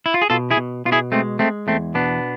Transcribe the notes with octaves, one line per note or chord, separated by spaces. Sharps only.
E4
F4
G#4
B2 F4 A4
E4 G#4
B2
B2 F4
E4 G#4
G#3 A3 C4
G#3 A3 C4
E2 A3 C4
B2 B3 D4